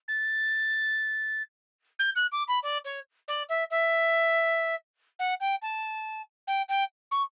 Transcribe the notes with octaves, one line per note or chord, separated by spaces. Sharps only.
A6
G6
F#6
D6
B5
D5
C#5
D5
E5
E5
F#5
G5
A5
G5
G5
C#6